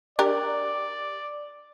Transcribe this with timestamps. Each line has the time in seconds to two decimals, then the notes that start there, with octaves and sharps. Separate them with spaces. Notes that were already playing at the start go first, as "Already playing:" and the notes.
0.19 D4 G4 A#4 D5